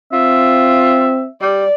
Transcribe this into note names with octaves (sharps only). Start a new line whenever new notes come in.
C4 F4 E5
G3 D5